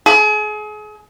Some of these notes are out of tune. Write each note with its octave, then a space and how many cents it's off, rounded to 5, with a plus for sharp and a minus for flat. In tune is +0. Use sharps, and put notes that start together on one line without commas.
G#4 +35